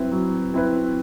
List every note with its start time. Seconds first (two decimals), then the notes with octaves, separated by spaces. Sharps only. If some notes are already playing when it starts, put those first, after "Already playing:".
Already playing: F#3 C4 E4 B4
0.12 F#3
0.54 C4 E4 B4